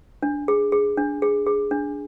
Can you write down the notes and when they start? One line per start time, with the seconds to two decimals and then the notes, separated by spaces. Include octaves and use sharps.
0.23 D4
0.48 G#4
0.72 G#4
0.98 D4
1.22 G#4
1.47 G#4
1.71 D4